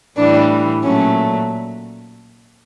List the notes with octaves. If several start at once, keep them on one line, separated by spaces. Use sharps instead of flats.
A2 E3 G3 D4
A#2 F#3 A3 C#4